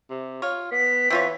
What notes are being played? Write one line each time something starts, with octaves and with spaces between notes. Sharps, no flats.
C3
F4 C#5
B3 B6
E3 C4 F4 C#5